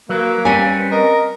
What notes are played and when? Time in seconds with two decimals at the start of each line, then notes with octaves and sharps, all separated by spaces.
0.09 F#3 A#3 B4
0.45 G3 C4 C#4 G#5
0.92 A#4 D#5